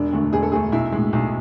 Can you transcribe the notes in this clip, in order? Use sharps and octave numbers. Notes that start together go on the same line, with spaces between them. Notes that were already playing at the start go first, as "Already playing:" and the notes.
Already playing: E1 D4
D2 D3 A3
E1 G#4
A4
D2 D3 A3 G#4
B1 E4
A2 G#3
B1